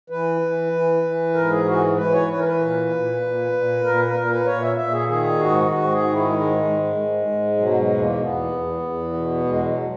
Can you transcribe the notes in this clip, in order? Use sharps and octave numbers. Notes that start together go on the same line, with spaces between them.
E3 B4
E3
E3
E3
G#2 A#4
G#4
E3 F#4
E3 B4
C#5
E3 B4
A#4
B4
A#2
A#2
A#2
A#2
A#2 A#4
B4
A#2 A#4
B4
A#2 C#5
E5
A#2 E5
G#4
D#3 G#4
G#2 F#4
G#2 F#4
G#4
D#3 F#4
E4
G#2 G#3
G#2
G#2
G#2
B2 F#3
G#3
E2
A#3
E2 B3
E2
E2
B2
E2 G#3
F#3